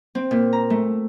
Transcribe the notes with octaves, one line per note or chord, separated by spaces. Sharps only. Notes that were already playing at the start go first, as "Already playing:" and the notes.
C4
A#2
A#5
A3